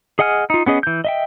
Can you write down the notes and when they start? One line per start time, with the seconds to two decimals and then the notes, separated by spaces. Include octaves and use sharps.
0.19 G#4 D#5 F#5 G#5 F6
0.50 D#4 F4
0.66 B3 C#4 G#4 D#5
0.83 E3 G6
1.05 D#5 E5 G5